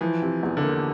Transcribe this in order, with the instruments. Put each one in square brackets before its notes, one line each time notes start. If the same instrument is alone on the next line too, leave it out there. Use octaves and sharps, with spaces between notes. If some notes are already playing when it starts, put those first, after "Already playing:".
[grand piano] E3 [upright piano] F3
[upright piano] C3
E2
[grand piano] D3
[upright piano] A#3